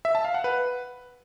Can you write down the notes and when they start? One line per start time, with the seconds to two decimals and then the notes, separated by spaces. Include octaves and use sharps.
0.05 E5
0.15 A5
0.25 F5
0.34 F#5
0.44 B4